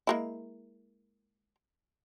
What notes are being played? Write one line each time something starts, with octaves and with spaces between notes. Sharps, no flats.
G#3 A#3 E4